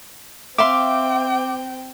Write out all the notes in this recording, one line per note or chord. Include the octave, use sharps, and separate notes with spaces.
C4 E5 F5 G5 C6 D6